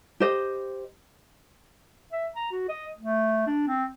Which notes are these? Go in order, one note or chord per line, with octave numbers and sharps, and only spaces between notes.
G4 C5 D#5
E5
A#5
F#4
D#5
A3
D4
C4